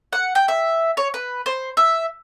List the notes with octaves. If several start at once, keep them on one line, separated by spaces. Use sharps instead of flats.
F#5
G5
E5
C#5
B4
C5
E5